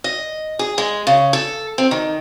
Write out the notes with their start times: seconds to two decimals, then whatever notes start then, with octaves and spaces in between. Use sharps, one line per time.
0.04 D#5
0.59 G#4
0.78 G#3
1.07 C#3
1.33 A4
1.78 C4
1.91 D#3